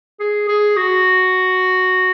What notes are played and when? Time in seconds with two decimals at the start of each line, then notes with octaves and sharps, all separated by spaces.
0.20 G#4
0.48 G#4
0.77 F#4